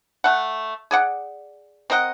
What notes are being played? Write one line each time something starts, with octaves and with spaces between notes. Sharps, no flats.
A3 F#5
G#4 D5 F#5
C4 A#4 D#5 F#5